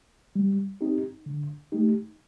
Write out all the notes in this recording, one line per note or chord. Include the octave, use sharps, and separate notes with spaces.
G3
C4 D#4 G4
D3
A3 D#4 G4